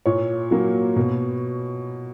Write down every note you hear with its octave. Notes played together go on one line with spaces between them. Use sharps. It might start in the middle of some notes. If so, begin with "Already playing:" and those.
A#2 C#5
F#3 A#3
B2